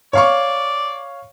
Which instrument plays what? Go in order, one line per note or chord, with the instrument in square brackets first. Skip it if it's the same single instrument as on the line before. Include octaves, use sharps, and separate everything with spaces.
[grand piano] C#5 F5 C#6 [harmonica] D5